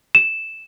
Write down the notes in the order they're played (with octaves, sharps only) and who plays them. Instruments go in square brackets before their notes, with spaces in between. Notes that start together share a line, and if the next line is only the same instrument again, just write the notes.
[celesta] E7